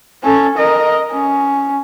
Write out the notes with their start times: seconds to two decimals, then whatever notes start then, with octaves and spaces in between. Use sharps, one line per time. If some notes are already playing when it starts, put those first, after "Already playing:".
0.23 C#4 A4
0.58 A#4 D#5
1.12 C#4